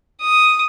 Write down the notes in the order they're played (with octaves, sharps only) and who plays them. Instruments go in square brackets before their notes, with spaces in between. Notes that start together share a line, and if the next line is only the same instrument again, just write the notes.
[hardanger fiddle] D#6